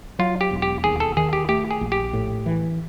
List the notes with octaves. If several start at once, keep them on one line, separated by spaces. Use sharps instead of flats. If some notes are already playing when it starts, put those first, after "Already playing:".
F#3 F4
G4
E1
G4
D#2 G#4
A4
D#3 G#4
G4
A3 G4
G#4
A#1
G4
A2
E3